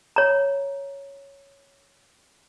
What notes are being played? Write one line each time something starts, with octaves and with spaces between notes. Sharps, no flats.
C#5 A#5